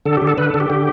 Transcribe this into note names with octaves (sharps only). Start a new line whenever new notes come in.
D3 A4
D3 G4
A4
D3 B4
A4
D3
G4
D3